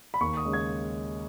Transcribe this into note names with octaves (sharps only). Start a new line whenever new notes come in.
B5
D#2 C#6
D#6
C#3 G#3
G#6